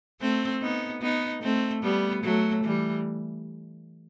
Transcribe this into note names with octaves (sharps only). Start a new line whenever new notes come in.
A3 C4
B3 D#4
B3 D#4
A3 C4
G3 B3
F#3 A3
E3 G3